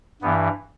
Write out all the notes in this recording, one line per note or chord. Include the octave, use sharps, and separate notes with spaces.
G2 E3 B3